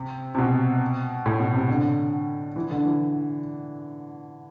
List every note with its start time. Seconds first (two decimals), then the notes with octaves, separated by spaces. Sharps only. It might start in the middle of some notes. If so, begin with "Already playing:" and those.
Already playing: C3
0.35 C3
0.38 B2
1.26 A2
1.40 B2
1.54 C3
1.69 D3
2.56 E3
2.71 D3
2.85 E3